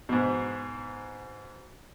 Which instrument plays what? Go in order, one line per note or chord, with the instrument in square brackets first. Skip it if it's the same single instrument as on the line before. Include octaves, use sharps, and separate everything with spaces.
[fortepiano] G#2 B2